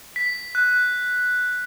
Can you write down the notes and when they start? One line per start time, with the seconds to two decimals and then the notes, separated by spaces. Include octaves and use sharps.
0.16 B6
0.55 F#6